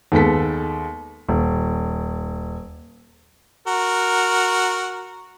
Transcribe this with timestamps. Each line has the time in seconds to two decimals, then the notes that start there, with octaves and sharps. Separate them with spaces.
0.12 D#2 G#3 B3 A4 B6
1.29 D#1
3.67 F#4 A#4